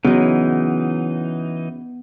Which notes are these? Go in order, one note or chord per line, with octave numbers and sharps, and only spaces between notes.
C#3 E3 F#3 B3 D#4